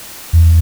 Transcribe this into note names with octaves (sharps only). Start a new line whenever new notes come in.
E2